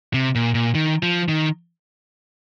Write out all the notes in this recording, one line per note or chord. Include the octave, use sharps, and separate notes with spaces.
C3
A#2
A#2
D#3
F3
D#3